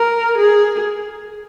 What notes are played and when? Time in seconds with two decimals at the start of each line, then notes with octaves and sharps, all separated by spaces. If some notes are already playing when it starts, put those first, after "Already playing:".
Already playing: A#4
0.38 G#4